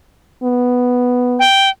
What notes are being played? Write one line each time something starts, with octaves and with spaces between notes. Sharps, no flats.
B3
G5